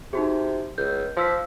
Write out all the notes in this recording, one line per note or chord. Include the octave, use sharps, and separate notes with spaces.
C3 D#4 F#4 G#4
C#2 G6
F3 C6 E6 B6